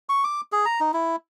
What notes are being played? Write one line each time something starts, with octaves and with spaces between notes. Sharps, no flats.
C#6
D6
G#4
A#5
D#4
E4